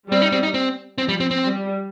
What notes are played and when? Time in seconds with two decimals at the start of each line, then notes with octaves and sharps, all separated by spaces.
0.10 G3 C4
0.22 D#4
0.32 C4
0.43 D#4
0.54 C4
0.98 F3 C4
1.09 G3
1.20 C4
1.31 C4
1.42 G3